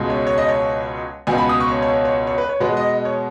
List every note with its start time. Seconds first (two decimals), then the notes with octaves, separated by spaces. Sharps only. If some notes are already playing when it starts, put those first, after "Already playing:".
Already playing: C#2 B2 G#3
0.10 C#5
0.27 C#5
0.38 D#5
0.49 C#5
1.27 C#2 B2 B3 G#5
1.38 B5
1.49 D#6
1.60 C#6
1.72 C#5
1.82 C#5
1.94 C#5
2.05 C#5
2.27 C#5
2.38 B4
2.49 C#5
2.60 B2 G#3 B3 B4
2.77 D#5
2.94 D#5
3.05 C#5